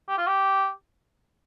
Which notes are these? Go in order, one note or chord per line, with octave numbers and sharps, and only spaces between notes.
G4
F4
G4